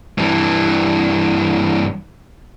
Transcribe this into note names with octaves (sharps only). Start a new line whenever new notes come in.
G2 E3